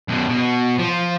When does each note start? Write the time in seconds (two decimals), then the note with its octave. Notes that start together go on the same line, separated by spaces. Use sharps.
0.08 F#2 B2
0.29 B2
0.79 F3